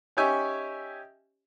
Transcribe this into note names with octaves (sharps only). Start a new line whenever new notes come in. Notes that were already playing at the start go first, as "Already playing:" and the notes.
C#4 D#4 G4 C#5 E5 G#5